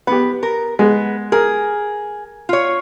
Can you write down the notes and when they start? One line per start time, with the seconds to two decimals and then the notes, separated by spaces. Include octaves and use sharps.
0.07 B3 G4 B4
0.43 A#4
0.79 G#3 B3
1.32 G#4 A#4
2.49 F4 C#5